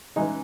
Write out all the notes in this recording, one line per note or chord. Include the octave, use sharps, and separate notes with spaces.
C#3 E3 G#3 D#4